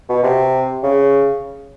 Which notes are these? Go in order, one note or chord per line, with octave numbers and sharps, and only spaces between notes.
B2
C3
C#3